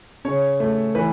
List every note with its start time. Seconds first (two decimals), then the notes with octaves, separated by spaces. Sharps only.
0.25 C#3 C#5
0.60 A3
0.95 E3 B4